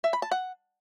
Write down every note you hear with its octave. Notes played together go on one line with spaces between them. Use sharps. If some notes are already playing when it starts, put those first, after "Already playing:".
E5
B5
A5
F#5